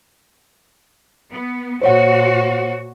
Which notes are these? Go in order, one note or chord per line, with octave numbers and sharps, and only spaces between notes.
B3
A#2 F#4 C5 C#5 F#5